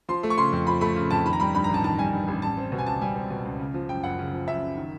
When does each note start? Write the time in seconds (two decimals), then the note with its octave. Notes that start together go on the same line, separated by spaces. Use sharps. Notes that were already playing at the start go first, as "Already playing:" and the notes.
0.09 F3 C6
0.23 A3
0.30 C#6
0.38 C#3 C6
0.52 F2
0.67 F3 B5
0.81 A3 B5
0.96 C#3
1.11 F2 A5
1.26 D#3 B5
1.33 A#5
1.40 G3 B5
1.55 G2 B5
1.64 A#5
1.69 A1 A5
1.84 D#3 A5
1.99 G3 G#5
2.13 G2
2.28 A1
2.42 G3 A5
2.57 C4
2.72 B2
2.78 G#5
2.87 C#2 A5
3.01 G3 G#5
3.16 C4
3.30 B2
3.45 C#2
3.59 C#3
3.74 F3
3.89 F#2 G5
4.03 F#1 F#5
4.19 C#3
4.33 F3
4.47 F#2 E5
4.62 F#1
4.77 D#3